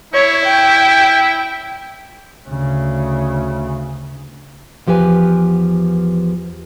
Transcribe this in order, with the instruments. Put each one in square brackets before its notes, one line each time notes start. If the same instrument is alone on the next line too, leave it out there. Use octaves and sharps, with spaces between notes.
[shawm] E4 [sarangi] C#5
[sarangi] G5
[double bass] D2 C#3
[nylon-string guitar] E2 F3 G4 B4 G#5